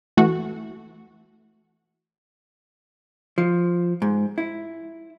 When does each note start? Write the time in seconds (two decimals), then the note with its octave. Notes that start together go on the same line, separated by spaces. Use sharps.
0.17 E3 A3 F#4
3.38 F3
4.02 G#2
4.38 E4